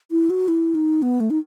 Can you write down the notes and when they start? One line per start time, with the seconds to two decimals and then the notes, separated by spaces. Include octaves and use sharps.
0.11 E4
0.30 F#4
0.48 E4
0.75 D#4
1.02 B3
1.20 A3
1.30 D#4